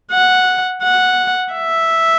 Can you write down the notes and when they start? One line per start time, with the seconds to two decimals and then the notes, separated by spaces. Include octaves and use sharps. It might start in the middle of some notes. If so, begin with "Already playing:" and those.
0.12 F#5
0.83 F#5
1.53 E5